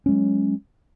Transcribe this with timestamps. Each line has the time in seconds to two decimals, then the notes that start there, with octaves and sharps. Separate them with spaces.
0.06 C#4
0.09 G#3
0.11 F#3